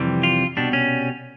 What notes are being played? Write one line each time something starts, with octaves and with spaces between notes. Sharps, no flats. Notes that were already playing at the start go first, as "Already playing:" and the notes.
Already playing: F2 C3 E3 G3
F4
C2 B2 G3 D4
C#4